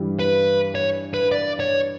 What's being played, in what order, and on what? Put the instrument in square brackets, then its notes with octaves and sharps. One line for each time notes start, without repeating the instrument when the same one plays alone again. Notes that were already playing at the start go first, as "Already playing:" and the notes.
Already playing: [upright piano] G2 E3 G3
[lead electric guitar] B4
C#5
B4
D5
C#5